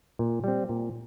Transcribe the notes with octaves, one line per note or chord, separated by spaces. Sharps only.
A#2
G3 C4
A#2